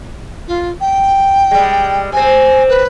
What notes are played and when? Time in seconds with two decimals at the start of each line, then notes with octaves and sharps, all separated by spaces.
0.47 F4
0.80 G5
1.51 G3 G#3
2.12 C3 C4 G#5
2.68 B4